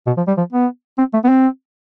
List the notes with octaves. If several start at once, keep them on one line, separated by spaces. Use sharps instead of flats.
B2
F3
G3
F3
B3
C4
A3
B3
C4